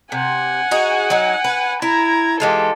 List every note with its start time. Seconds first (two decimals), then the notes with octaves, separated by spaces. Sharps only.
0.12 C3 F#5 G#5
0.71 D#4 F#4 G#4
1.10 F#3 D#4
1.44 B4
1.82 E4 A#5 G#6
2.40 E3 G#3 F4 G4 A4